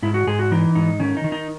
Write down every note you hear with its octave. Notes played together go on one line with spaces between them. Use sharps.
G#2 E4
F#4
G#2 G#4
F#4
E3 D#4
G#2 D#4
D#3 C#4
D#4
D#3
D#4